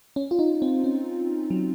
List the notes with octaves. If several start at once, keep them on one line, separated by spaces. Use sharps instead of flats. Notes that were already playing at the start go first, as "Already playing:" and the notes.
C#4
F4
D#4
C4
C#4
F#3